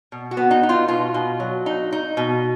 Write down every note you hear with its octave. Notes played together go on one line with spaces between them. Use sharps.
B2
F#4
B3
D#4
D#4
F4
B2 F4
B2
F#3
D#4
D#4
B2